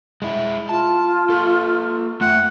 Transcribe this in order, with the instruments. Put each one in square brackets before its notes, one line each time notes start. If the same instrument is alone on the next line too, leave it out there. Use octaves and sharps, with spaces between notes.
[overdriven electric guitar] G#3 E4
[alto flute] F4 [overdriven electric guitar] A5
[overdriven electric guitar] A#3 A4
[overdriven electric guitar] A3 F4 [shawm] F#5